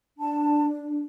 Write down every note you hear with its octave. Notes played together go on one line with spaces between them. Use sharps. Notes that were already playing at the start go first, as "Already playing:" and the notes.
D4 A5